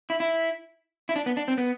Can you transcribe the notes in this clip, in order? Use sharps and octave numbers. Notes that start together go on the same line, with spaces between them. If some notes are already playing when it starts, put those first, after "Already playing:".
E4
E4
E4
D4
B3
D4
C4
B3